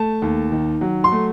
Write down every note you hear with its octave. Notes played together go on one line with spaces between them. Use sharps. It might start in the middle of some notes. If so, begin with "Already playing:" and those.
Already playing: A3 A5
D#2
D#3
F#3
C6
A3